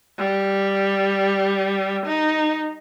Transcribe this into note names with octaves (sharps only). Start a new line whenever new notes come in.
G3
D#4